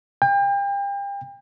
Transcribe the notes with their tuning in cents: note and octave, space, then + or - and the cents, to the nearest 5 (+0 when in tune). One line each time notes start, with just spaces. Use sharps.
G5 +35